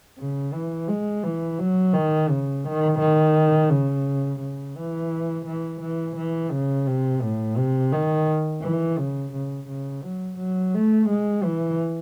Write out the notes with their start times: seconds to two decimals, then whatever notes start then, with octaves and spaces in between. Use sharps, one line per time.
0.19 C#3
0.53 E3
0.89 G#3
1.24 E3
1.59 F#3
1.94 D#3
2.29 C#3
2.65 D#3
2.99 D#3
3.70 C#3
4.40 C#3
4.76 E3
5.46 E3
5.82 E3
6.17 E3
6.52 C#3
6.87 C3
7.22 A2
7.58 C3
7.93 D#3
8.63 E3
8.98 C#3
9.33 C#3
9.68 C#3
10.04 F#3
10.38 F#3
10.75 A3
11.09 G#3
11.44 E3